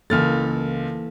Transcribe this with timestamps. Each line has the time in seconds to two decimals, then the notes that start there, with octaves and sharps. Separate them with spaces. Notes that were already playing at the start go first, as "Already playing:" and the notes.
0.10 C#2 E3 A#3 A4 F6 A6